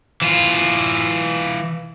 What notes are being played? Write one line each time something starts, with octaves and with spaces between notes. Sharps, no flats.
E3 F4